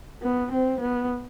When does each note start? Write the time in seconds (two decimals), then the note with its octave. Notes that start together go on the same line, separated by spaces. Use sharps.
0.22 B3
0.52 C4
0.81 B3